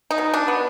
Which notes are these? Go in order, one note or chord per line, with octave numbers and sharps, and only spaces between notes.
D#4
B2
D4
B3